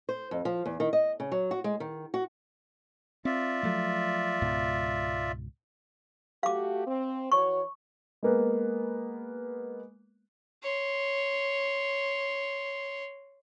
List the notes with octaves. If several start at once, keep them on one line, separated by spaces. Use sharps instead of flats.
C5
F2
F3
E2
D#3
D#5
C#3
F#3
F#4
G#3
D#3
F#4
C4 F4 D5 E5
F3 F#3 A3
C#2 G#2 B2
A3 F#4 G4 F5 D6
C4
E3 F#4 C#5 C#6
G#3 A#3 B3
C#5 C6